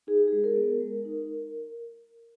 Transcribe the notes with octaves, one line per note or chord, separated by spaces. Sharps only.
D#4 G#4
G4
G#3 G#4
A#4
B3
G#3
D#4